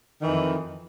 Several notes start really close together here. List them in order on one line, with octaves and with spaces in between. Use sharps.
D#3 E3 F2